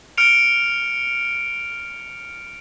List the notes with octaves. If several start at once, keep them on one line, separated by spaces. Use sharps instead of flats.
F6 C#7 D7 F7